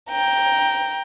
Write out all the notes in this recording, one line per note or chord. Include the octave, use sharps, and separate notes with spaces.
G5 A#5